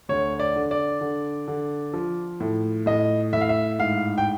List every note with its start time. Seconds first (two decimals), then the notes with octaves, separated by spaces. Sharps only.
0.09 D2 C#5
0.39 D5
0.56 D3
0.71 D5
1.01 D3
1.48 D3
1.93 F3
2.40 A2
2.86 A2 D#5
3.33 A2 E5
3.41 F5
3.49 E5
3.79 G#2 F5
4.18 G5